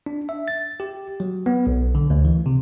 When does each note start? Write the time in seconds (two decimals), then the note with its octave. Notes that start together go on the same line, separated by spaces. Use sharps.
0.06 D4
0.29 E5
0.48 A6
0.80 G4
1.20 F#3
1.46 B3
1.67 B1
1.95 D3
2.10 D2
2.25 E3
2.46 C3